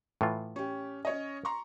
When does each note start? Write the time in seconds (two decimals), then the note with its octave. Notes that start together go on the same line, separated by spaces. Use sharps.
0.21 A2 E3 F4
0.56 C#4 G4
1.05 C#4 C#5 D#5
1.45 A#5 C6 C#6